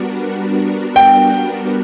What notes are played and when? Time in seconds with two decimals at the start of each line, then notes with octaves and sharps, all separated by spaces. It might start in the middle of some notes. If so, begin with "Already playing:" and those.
Already playing: G3 B3 D4 F#4 A#4
0.96 G5